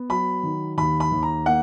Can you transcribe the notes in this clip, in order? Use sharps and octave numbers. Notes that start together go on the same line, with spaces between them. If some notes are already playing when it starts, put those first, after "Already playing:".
Already playing: B3
F#3 B5
D#3
D#2 B5
B5
D#2
A#5
A#3 F#5